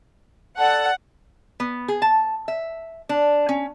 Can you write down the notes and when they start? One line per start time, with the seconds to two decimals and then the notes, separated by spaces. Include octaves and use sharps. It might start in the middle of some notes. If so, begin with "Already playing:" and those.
0.58 A4 D5 F#5 A5
1.60 B3
1.88 G#4
2.02 A5
2.48 E5
3.09 D4
3.49 C#4